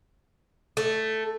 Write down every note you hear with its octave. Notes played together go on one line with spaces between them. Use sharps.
A3